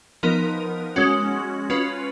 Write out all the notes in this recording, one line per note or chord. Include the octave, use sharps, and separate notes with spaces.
F3 B3 D#4 A#4
G#3 C#4 F#4
C#4 F4 B4